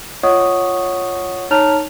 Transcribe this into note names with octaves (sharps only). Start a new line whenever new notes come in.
F4 C#5 D#5 F#5 C#6 D#6
D#4 C#5 A5 A#5 F6 F7